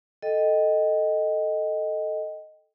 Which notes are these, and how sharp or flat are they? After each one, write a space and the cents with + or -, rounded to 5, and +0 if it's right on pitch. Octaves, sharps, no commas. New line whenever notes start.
A4 +0 D#5 +0 G5 +0